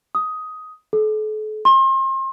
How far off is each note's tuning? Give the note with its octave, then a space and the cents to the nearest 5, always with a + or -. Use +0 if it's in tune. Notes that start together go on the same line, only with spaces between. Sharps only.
D#6 +10
A4 -40
C6 +35